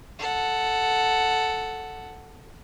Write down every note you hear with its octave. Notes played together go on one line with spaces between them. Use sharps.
A4 F#5